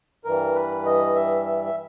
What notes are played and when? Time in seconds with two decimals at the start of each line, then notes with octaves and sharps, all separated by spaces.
0.25 G2 E3 G3 A#4
0.55 B4
0.86 D#5
1.16 E5
1.46 E5
1.65 E5